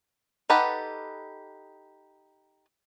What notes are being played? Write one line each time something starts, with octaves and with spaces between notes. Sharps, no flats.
D#4 G4 A4 B4 F#5